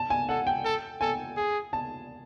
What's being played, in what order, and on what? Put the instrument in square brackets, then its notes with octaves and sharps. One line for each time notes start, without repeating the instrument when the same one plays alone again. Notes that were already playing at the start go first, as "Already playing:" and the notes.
Already playing: [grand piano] A5
G#5
[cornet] A4 [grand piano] F#5
[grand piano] G5
[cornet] A4
[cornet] A4 [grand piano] G#5
[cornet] G#4
[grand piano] A5